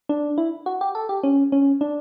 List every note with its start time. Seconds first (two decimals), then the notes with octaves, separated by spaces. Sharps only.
0.09 D4
0.38 E4
0.66 F#4
0.81 G4
0.95 A4
1.09 G4
1.24 C#4
1.52 C#4
1.81 D4